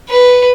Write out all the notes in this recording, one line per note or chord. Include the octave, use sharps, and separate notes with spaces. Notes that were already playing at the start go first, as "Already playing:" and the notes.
B4